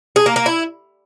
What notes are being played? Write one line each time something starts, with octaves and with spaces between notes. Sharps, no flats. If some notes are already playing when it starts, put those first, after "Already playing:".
G#4
A#3
A#3
E4